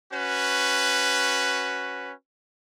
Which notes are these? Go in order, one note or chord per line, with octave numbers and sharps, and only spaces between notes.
C#4 F#4 B4